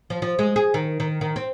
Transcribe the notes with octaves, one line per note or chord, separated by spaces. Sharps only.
F3
F3
G#3
G#4
D#3
D#3
D#3
C4